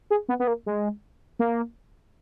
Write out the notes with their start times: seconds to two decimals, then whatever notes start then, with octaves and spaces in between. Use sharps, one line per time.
0.11 G#4
0.29 B3
0.40 B3
0.47 A#3
0.66 G#3
1.39 A#3